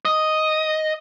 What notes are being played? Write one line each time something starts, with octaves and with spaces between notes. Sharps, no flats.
D#5